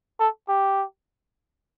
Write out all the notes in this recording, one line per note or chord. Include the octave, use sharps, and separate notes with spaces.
A4
G4